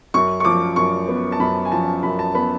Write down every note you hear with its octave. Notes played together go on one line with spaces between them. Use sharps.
F#2 C#6
C#6
F3 D6
F#2 C#6
B3
A5
F#2 B5
G#5
F3 A5
F#2 B5
A5
B3 B5